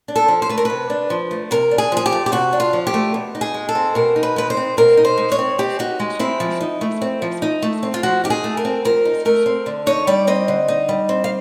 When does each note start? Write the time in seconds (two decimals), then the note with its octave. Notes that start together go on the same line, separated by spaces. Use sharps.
0.08 D4
0.16 A4
0.28 F3
0.42 C5
0.49 A3 B4
0.58 A#4
0.65 C3 B4
0.90 D4
1.10 F3
1.31 A3
1.51 C3 A#4
1.71 D4
1.78 G#4
1.92 F3 G#4
2.06 G4
2.12 A3
2.26 G4
2.32 C3 F#4
2.53 D4
2.60 F4
2.73 F3
2.87 G4
2.94 A3
3.14 B2
3.35 D#4
3.41 G#4
3.54 G#3
3.69 A4
3.75 C4
3.95 B2 A#4
4.16 D#4
4.23 B4
4.36 G#3 B4
4.50 C5
4.57 C4
4.77 B2 A#4
4.97 D#4
5.05 C5
5.18 G#3
5.32 C#5
5.39 C4
5.59 B2 G4
5.79 D#4 F#4
6.00 G#3
6.19 C4 E4
6.40 F3
6.61 D#4
6.81 A3
7.02 C4
7.22 F3
7.42 D#4
7.62 A3
7.83 C4
7.94 F4
8.03 F3 F#4
8.24 D#4 G4
8.30 G#4
8.44 A3
8.57 A#4
8.65 C4
8.85 F3 A#4
9.05 D#4
9.25 A3 A#4
9.46 C4
9.66 D3
9.87 D#4 C#5
10.07 G3 D5
10.27 C4 D#5
10.48 D3
10.68 D#4
10.89 G3
11.09 C4
11.24 F5